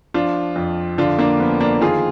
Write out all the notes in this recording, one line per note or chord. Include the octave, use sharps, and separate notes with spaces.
F3 D4 F4
F2
D3 D4 F4
A#3 D4
F3 B3
A#3 D4
D#3 F4 G#4